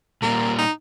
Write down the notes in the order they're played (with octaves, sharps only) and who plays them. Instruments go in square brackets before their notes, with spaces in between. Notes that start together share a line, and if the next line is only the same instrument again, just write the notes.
[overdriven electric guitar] A#2 G3 [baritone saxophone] A#3
[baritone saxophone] D#4